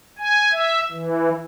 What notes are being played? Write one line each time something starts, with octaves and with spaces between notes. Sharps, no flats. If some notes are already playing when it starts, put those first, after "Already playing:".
G#5
E5
E3